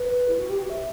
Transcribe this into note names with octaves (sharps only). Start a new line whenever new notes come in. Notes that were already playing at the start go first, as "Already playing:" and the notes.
Already playing: B4
E4
F#4
G4
F#4
E5